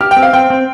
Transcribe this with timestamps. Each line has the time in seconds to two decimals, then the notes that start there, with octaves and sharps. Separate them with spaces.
0.01 G4 F6
0.11 G5
0.16 C4
0.23 F5
0.33 C4 G5
0.50 C4